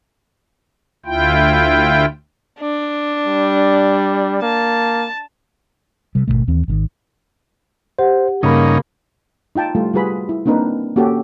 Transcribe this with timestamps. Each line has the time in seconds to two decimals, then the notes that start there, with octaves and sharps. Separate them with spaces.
1.06 D2 E4 F4 G5
2.60 D4
3.26 G3
4.42 A#3 A5
6.15 C3 G3
6.28 G#1 E2 B2 A3
6.47 D#2 E3 C4
6.68 G#1 C3 D#3
7.99 G4 C5 F#5
8.43 G2 C#3 A#3 C#4 D#4 B5
9.55 D#4 F4 G5 A5
9.75 G3 A3 F4
9.94 G3 F4 F#4 G#4 B4 B5
10.29 E4
10.46 A#3 C4 D4 D#4 A#4 B4
10.96 A#3 C#4 F#4 G4 A4